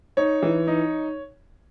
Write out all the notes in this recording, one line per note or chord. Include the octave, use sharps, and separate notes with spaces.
D#4 C#5
E3
D#4